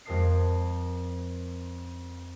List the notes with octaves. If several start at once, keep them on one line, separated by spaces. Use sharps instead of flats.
F2 G#3 A#4 A5 D#6 C7